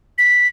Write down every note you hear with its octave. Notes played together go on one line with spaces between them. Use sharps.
B6